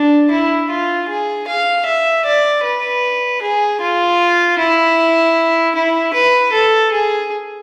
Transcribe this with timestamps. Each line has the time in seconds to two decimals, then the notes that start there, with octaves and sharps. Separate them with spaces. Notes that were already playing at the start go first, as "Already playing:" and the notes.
Already playing: D4
0.31 E4
0.70 F4
1.09 G#4
1.47 F5
1.86 E5
2.25 D5
2.63 B4
3.41 G#4
3.80 F4
4.59 E4
5.75 E4
6.13 B4
6.52 A4
6.91 G#4